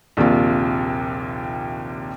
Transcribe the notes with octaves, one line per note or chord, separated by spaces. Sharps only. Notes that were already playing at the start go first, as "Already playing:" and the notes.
A#1 D#2 C3 F4